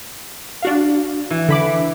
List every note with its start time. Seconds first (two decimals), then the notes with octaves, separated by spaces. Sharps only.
0.62 D4 F#4 F5
1.30 E3
1.48 D3 B5 D6